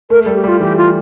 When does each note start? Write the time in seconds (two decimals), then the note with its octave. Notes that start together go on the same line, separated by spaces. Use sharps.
0.10 A3 A#4
0.23 G3 A4
0.36 G4
0.44 G3 F4
0.60 E3 G4
0.77 F4